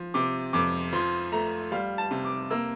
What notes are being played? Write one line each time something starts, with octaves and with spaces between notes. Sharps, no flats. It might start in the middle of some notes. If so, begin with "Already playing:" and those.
Already playing: F3
C3 D6
F2 D6
F3 C6
A3 A#5
G3 F5
A5
C3
D6
A#3 E6